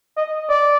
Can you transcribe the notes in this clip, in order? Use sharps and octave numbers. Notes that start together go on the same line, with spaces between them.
D#5
D5